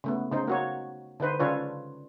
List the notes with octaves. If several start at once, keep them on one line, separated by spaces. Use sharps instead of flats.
C#3 A3 B3
C#3 D#4 C5
A#3 F#4 C#5
D3 D#4 B4 C5
C#3 D4 F4 A4 B4 C#5